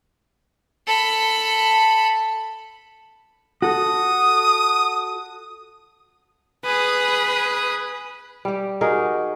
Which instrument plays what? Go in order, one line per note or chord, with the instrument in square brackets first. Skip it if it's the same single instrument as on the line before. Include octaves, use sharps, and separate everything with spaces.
[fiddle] A4 B5
[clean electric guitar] F#4 A4 [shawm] D#6
[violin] G#4 D#6 [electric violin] B4
[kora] G3 G4
D#4 F#4 G#4 A#4